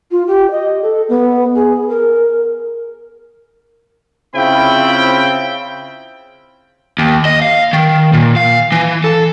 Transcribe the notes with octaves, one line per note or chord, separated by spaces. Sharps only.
F4
G4
D#5
A4
B3
G#4
A#4
C#3 C4 E4 F4 G5 B5
D#2
D#5
F5
D#3
A#2
F5
E3
A4